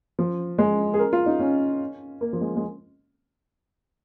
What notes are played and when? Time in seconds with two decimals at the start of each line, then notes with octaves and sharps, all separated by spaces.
0.19 F3
0.58 G#3
0.94 G#4
0.99 A#4
1.13 F4
1.26 D#4
1.40 C#4
2.21 A#3
2.33 F3
2.41 G#3
2.56 G#3